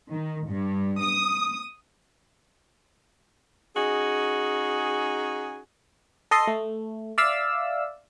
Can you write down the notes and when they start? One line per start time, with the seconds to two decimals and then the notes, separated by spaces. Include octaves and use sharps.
0.11 D#3
0.48 G2
1.00 D#6
3.76 C#4 D#4 F#4 G#4
6.31 A4 D#5 C6
6.47 A3
7.18 D5 E5 F5 E6